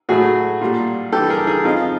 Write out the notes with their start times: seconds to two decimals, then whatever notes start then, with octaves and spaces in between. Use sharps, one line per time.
0.09 A2 F#3 A3 F#4 G#4
0.61 A#2 G3
1.12 G2 E3 G3 G4 A4
1.30 G#4 A#4
1.47 G#4 A#4
1.64 F2 C#3 F3 D#4 F4